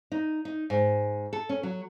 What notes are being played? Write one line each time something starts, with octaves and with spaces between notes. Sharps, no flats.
D#4
D#4
G#2
A4
C#4
F#3